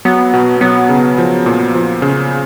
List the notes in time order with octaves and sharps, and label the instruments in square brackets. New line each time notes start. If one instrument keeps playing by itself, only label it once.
[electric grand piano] F#3 [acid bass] B3
[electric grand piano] B2
[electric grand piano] F#3 [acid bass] B3
[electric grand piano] C#3
F3
A#2
F3
C#3